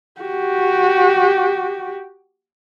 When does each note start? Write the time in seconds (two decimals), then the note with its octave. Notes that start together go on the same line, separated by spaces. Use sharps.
0.21 F#4 G4